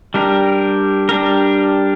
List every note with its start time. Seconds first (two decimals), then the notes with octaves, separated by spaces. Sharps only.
0.14 G3 D4 G4 A#4
1.09 G3 D4 G4 A#4